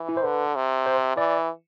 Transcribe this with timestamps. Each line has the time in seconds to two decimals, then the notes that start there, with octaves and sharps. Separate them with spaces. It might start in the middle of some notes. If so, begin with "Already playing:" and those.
Already playing: E3
0.09 E4
0.17 C5
0.23 D3 B4
0.55 C3
0.86 C5
1.17 E3 D5